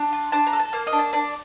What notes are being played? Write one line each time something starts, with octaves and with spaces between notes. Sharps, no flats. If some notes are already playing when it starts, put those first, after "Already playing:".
Already playing: D4
F4
D4 A5
A#5
A4
A5
A#3 F5
D#5
D4
A5
D4 D5